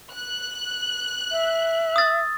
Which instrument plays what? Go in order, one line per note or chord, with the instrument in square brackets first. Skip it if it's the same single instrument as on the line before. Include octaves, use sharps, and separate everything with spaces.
[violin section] F#6
[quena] E5
[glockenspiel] D#6 E6 A6